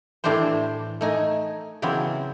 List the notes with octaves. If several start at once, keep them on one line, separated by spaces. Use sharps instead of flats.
A2 E3 A3 D4 G4 C5
A3 D#4 G#5
C#3 E3 F#3 B3 C4